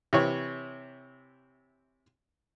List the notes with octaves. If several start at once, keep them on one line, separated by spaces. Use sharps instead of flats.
C3 E3 C#5